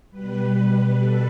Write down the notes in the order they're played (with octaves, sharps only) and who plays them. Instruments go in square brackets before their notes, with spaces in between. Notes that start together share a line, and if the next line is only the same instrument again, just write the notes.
[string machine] B2 G3 B4
A4